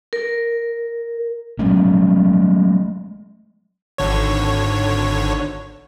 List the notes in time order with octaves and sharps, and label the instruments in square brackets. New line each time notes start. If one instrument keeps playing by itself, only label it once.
[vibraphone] A#4
[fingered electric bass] F#3 G#3 A3 C#4
[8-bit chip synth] G#1 D3 C#5